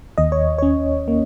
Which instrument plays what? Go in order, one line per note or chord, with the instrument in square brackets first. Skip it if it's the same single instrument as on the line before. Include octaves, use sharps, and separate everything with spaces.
[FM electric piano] D#2 D#5
C#5
C#4 C#5
A#3